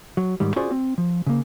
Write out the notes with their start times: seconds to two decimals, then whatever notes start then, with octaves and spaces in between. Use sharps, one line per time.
0.17 F#3
0.40 G#2 D#3 G3
0.56 C#4 F4 F#4 G#4 C5 D5
0.71 C4
0.98 F3
1.27 C#3 A#3